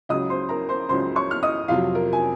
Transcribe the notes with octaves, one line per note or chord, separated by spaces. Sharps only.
C#2 C#3 F#3 D#5 D#6
C5 C6
A#4 A#5
C5 C6
C#2 C#3 F#3 C5 C6
C#5 C#6
F6
D#5 D#6
F2 C3 F#3 F4 F5
A#4
G#5